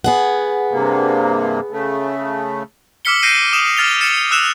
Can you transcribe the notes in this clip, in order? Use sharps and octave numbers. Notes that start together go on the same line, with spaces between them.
B3 G#4 F#5
G2 C3 A#3
C#3 A3
D6 E6 F6 B6 C#7 G7
G6 A#6 C7 D7 D#7
D#6 E7 F#7
F6 A6 F7 G7
F6 A6 C#7 E7
E6 F#6 E7 F7